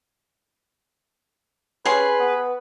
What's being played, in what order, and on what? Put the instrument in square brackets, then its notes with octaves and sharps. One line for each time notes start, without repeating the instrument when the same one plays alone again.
[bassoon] C#4 [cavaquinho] G#4 C6 [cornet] B4
[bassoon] B3